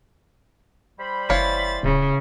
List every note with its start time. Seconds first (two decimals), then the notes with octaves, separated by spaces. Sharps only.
0.98 G3 C5 B5
1.30 F#1 E3 C#5 F5 A6
1.83 D1 C#3